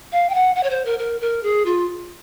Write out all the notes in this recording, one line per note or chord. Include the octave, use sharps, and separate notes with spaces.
F5
G5
F#5
F#5
C#5
C5
A#4
A#4
A#4
G#4
F4